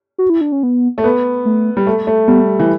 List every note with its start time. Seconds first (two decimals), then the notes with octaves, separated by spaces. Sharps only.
0.18 F#4
0.30 E4
0.41 D4
0.52 C#4
0.63 B3
0.98 A3
1.04 B3
1.45 A3
1.77 G3
1.87 A3
2.07 A3
2.28 G3 B3
2.60 E3